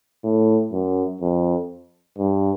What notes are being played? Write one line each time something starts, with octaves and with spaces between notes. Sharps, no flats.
A2
F#2
F2
G2